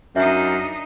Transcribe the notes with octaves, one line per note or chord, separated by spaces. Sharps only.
F#2 D4 D#4 E5